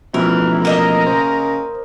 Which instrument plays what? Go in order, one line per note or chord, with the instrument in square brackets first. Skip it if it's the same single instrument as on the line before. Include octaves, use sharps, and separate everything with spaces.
[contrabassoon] A1 [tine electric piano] B2 F3 [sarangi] E3 [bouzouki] A#4
[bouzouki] A#3 D#5 E5 [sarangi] A#4
[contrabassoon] C#3 [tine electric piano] C5